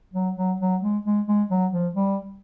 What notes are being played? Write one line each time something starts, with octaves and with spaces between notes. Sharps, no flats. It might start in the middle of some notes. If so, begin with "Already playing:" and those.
F#3
F#3
F#3
G#3
G#3
G#3
F#3
F3
G3